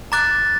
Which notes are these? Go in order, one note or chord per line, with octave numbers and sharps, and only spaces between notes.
A#5 D6 F#6 A6